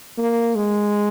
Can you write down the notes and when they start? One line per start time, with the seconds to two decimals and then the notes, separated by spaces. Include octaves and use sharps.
0.18 A#3
0.55 G#3